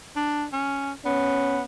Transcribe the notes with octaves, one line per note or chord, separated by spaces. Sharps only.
D4
C#4
B3 C#4